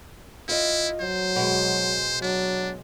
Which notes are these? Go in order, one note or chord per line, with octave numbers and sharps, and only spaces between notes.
E4 F4 D#5
F#3 C5
B2 G#3
F#3 D4